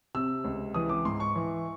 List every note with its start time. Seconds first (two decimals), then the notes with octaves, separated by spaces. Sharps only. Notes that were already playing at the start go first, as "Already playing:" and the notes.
0.15 C3 E6
0.44 C#2
0.74 E3 D#6
0.89 D6
1.05 G#2 C6
1.20 C#6
1.36 E3